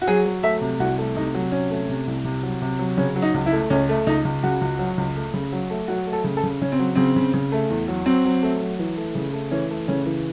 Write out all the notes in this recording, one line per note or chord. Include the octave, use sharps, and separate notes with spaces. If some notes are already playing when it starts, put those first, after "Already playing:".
F#4
F#3 G#4
F#3
A3 E5
C3
C2 F#4
A3
C3 D#4
F#3
C3 C#4
A3
C3
C2
C3
F#3
C3
F#3
C#3 C#4
F#3
D#4
C#2
E4
A3
C#2 C#4
A3
C#2 D#4
C#2
C#3 F#4
C#2
F#3
C#2
A3
C#3
F#3
A3
F#3 F#4
A3
A4
C#3
A4
C#3
C#3 C#4
C4
F#3
C#3 C4
C#3
C#3
A3
E2
F#3
F#3 C4
F#3
A3
F#3
E3
A3
C#3
A3
E3 C#4
A3
C#3 C#4
E3